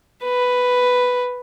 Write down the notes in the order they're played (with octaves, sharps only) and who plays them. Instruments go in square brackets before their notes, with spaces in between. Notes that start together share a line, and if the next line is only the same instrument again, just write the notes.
[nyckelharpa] B4